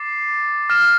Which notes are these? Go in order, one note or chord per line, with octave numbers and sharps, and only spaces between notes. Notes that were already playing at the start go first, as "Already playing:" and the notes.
Already playing: D6 A6 C7
F6 A#6 E7